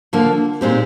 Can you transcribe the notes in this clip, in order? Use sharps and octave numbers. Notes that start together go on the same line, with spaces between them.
D3 F3 A#3
A#2 G#3 C4 D#4 G4